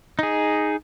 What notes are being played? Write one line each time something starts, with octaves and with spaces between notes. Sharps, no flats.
D#4 G#4